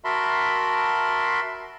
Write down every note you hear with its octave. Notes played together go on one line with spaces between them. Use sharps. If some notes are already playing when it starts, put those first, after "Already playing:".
F#4 A#4 E5 A5 B5 C6